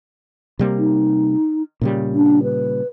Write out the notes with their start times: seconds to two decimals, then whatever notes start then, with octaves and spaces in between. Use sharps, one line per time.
0.59 C3 G3 A#3
0.78 D#4
1.81 A#2 C#3 G3
2.15 D4
2.43 B4